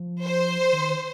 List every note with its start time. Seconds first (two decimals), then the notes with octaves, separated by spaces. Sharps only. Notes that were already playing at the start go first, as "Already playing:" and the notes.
Already playing: F3
0.23 C5
0.73 D#3